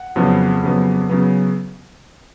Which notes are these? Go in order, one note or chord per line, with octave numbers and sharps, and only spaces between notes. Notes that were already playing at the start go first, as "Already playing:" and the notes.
Already playing: F#5
F2 C#3 F#3 B3
F2 C#3 F#3 B3
C#3 F#3 B3